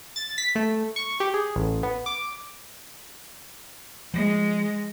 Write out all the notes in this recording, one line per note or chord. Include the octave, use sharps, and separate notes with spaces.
A6
B6
A3
C#6
G4
G#4
A1
B3
D6
F3 G#3